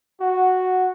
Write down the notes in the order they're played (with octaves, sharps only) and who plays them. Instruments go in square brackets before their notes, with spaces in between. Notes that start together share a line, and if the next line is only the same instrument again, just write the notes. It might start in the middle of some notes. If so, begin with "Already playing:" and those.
[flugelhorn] F#4 [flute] F#5